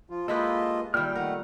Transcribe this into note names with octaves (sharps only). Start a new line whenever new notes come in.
F3 F4
G#3 A#3 E4 F4 G4 A4 B4 D#5
A#2 D#3 G3 E4 G5 F6
D#3 A3 A#4 F#5